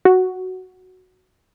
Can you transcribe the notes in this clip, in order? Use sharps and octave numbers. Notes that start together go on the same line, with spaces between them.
F#4